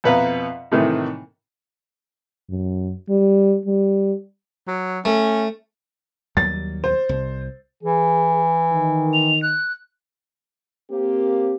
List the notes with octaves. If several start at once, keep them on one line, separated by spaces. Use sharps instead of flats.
F2 B2 B4 E5 F5 A#5
A2 C3 D#3 E3 A3 A#3
F#2
G3
G3
F#3
A3 C#4
D#2 F#3 G3 A6
C5
C2
E3 G#4
D#3
F7
F#6
A#3 C4 G4